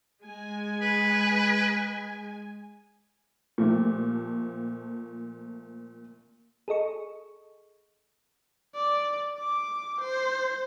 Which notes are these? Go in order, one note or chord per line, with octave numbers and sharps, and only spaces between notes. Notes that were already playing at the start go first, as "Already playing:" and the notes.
G#3 G#5
B4
A#2 F3 A3 G4
G#4 A4 D#5 C#6
D5
D6
C5